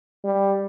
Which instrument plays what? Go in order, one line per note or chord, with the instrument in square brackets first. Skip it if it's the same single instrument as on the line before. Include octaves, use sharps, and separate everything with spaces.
[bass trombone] G3